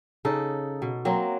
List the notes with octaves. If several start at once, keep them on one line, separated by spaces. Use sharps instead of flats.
C#3 D#4 A4
B2
F#3 A#3 C4